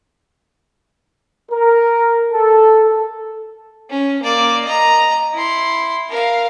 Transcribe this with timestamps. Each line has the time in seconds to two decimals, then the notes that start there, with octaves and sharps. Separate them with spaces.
1.51 A#4
2.31 A4
3.90 C#4
4.22 A#3 D5
4.65 D#5 A#5
5.34 E4 C6
6.09 A#4 F5